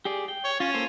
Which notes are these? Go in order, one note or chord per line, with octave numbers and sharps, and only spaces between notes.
G4 G#4 D5
G5
C#5
C#4 F4
A#3 A4 C5